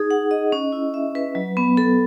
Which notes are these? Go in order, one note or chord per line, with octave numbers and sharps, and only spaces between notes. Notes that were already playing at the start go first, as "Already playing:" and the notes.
Already playing: D#4 G#4
F#5
D#5
C#4
E4
E5
B4
F#3
B3
A4